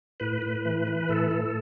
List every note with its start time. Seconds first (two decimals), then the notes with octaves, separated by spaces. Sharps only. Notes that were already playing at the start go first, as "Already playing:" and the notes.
0.20 A2 B4
0.42 A2
0.65 E3
0.87 E3
1.09 A2 A4
1.31 A2